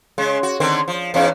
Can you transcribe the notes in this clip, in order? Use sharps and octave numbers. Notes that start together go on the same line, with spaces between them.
C#3 G#3
F#4
D3 D#3 C4
F3
E2 G#2 C#4